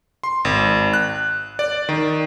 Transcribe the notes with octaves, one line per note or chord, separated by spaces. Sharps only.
C6
G#1
F#6
D5
D#3